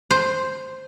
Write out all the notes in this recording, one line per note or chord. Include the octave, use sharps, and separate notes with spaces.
C5